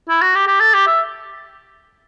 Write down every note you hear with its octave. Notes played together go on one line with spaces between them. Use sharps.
E4
F#4
G4
G4
A4
G4
E5